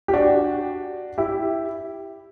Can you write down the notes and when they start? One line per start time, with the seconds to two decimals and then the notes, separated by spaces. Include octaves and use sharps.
0.08 G4
0.13 D4 F#4
1.18 E4 G4